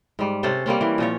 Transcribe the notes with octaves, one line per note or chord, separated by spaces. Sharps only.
G#2 G3
C3 C#4 A4 C5
G3 A#3 C4 C#4
E3
A#2 F3 C#5